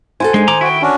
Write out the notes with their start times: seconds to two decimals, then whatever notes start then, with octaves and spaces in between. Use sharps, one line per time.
0.20 E4 F#4 A4 C5 G#5
0.34 G#3 D4 D#4
0.48 D#3 A#5 D6
0.61 E4 F#4 G5
0.82 C#4 D4 F#4